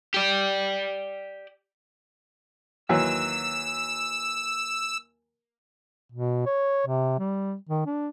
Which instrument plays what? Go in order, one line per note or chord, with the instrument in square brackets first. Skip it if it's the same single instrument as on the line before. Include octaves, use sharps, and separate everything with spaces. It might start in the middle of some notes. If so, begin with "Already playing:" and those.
[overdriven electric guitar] G4 D5
[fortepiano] D#2 E3 F#3 [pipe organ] E6
[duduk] B2
C#5
C3
G3
D#3
D4